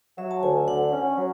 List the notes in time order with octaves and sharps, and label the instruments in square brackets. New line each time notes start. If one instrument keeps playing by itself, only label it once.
[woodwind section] F#3 [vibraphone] E5
[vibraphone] A5
[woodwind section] D2 [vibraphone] G#5
[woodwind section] D3 [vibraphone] F#5
[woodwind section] C#4
F#3